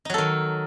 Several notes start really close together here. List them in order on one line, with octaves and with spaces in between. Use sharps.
D#4 F#3 A4 D#3